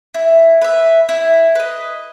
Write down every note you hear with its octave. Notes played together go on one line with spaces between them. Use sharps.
E4
B4 E5
E4
B4 D#5